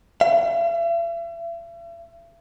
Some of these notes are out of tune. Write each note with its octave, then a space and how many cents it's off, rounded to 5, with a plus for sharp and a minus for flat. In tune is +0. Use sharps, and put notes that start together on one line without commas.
E5 +45